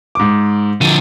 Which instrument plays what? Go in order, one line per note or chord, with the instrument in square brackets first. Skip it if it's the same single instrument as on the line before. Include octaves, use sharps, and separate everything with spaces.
[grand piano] G#2 D6
[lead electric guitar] D3 F3 [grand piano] D#7